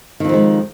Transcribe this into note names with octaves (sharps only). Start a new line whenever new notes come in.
F2 D#3 F3 G#3